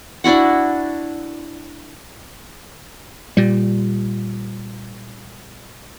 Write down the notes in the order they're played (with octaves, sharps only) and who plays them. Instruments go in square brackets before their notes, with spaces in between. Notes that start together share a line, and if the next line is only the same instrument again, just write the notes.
[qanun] D4 E4 F#4 F#5
[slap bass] A#2 G3